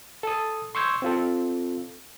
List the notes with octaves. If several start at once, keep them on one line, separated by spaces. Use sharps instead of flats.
A4 A5 D#6
C6 C#6 E6 G6 G#6
C4 F4 A4